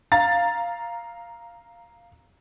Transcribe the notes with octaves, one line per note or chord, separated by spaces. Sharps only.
F5 A#5 A6